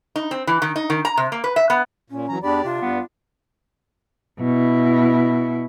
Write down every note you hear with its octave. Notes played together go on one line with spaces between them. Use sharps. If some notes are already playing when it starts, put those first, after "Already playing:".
D#4
C4
E3
D#3
D#4
D#3
A#5
C3
A#3
B4
E5
B3
A#2 C#4
E3 F#3 A#5
E2 D4 G4 D5 B5
C3 D4 F4
G2 G3 B3
B2 E4